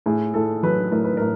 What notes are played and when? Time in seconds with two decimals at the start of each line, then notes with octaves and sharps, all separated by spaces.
0.06 A2 G#4
0.34 A2 A4
0.63 F#3 B4
0.91 A2 A#4
1.04 B4
1.17 A2 A#4